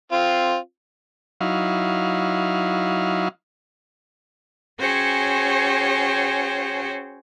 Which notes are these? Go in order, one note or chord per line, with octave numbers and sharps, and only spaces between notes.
C4 F4
F#3 D#4 E4 F5
C#4 F#4 G#4 C5 C#5 G5